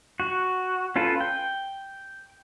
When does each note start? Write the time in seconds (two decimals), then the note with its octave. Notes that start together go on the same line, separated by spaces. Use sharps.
0.20 F#4
0.96 C#4 F4 A4 B4
1.21 G5